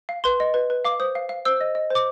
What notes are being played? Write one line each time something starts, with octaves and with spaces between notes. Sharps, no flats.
F5
B4 C6
D#5
B4
B4
F5 D6
C5 D#6
F5
F5
C5 E6
D#5
D#5
C5 D6